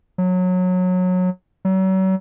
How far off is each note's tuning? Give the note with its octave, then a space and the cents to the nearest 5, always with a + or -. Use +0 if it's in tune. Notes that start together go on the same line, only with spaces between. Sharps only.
F#3 -20
F#3 +40